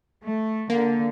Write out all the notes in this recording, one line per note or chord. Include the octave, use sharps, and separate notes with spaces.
A3
D3 A#3